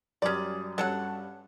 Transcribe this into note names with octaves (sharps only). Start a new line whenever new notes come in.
F#2 G3 C#4 D5 D#6
G2 F#3 C#4 A4 F#5